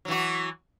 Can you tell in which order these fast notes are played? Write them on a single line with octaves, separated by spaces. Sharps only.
F#3 E3 F#4